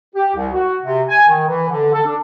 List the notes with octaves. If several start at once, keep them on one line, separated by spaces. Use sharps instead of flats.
G4
C2
F#4
C3
G#5
D#3
E3
D3
A4
D4